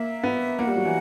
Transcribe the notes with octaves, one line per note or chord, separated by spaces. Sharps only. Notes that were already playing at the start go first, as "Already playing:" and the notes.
Already playing: A#3 E5
B3
A#3 F#5
G3
F#3
E3